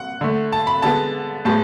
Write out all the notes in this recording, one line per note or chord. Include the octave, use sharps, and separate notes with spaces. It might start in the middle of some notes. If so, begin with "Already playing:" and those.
Already playing: F#5
D3 A3
A5
B5
D3 G#3 B3 A5
A2 G#3 B3 A5